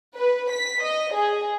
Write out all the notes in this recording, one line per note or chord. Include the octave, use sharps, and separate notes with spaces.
B4
B6
D#5
G#4